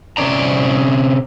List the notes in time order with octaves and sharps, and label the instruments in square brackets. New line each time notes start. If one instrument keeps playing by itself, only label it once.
[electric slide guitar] C3 C4 C#4 D5 A#5